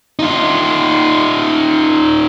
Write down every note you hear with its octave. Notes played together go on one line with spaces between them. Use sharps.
D#4 F4